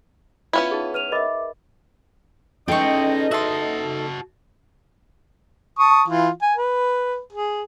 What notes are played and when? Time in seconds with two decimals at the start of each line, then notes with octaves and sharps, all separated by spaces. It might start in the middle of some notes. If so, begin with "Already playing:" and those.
0.53 B3 C#4 E4 F4 F5
0.71 D#4 G#4
0.94 B4 F6 D#7 F7
1.12 A#4 D#5 E5 B5 D6
2.68 E2 C#4 D#4 A4 D#5 G5 C6 C#6
3.31 F#4 E5 A5 C6
5.79 A5 C#6 D#6
6.08 E3 F4
6.42 G#5
6.56 B4
7.33 G#4